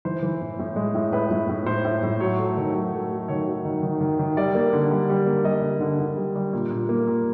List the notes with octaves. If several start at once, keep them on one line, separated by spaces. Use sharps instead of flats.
E3 C5
E3
A2
A2
G#3
A2
A2 B4
A2
A2
A2 C5
A2
A2
F#3 C#5
A3
D#3
F#3
A3
F#3
D#3 C#5
F#3
D#3
D#3
D#3
D#3
G3 D5
A#3
D3
G3
G3
A#3
G3 D#5
D3
D3
D3
G3
G3
A#2
A#2
A#3
A#2